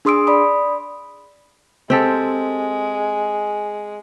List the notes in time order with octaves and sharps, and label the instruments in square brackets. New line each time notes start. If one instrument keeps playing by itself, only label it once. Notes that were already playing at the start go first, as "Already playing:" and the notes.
[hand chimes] D4 G#4 C6 D#6 E6 D7
D5 B5 D#6
[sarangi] G#3 [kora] C4 G4 A4